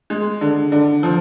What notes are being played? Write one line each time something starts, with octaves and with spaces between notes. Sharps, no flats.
G#3
D3
D3
F3